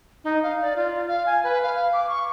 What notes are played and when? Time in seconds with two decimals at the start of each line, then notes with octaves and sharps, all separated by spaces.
0.24 D#4
0.43 F5
0.62 D5
0.76 F4
1.07 F5
1.26 G#5
1.44 B4
1.63 F5
1.93 D6
2.09 C#6